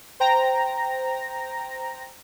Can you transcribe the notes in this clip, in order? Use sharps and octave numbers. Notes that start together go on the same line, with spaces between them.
C5 G5 A#5 A#6